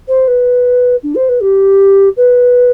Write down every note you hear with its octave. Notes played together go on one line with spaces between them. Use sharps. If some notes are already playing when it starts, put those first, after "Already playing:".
C5
B4
D4
C5
B4
G4
B4